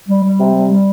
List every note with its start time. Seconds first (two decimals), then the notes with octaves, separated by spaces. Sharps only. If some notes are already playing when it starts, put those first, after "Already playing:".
0.08 G3
0.23 G3
0.40 C3
0.55 G3
0.71 G3